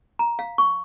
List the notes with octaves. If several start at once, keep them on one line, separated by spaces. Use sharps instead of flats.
A#5
F5
C#6